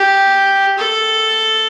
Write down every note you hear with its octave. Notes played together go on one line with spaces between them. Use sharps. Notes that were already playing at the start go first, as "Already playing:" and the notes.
Already playing: G4
A4